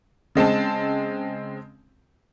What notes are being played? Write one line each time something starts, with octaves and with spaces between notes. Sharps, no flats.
C#3 G#3 C4 A5